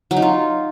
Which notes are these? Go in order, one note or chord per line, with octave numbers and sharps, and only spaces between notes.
F#3
D#4
F4